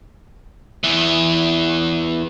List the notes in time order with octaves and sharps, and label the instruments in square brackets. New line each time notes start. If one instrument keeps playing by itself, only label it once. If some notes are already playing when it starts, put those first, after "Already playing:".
[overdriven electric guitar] E2 E3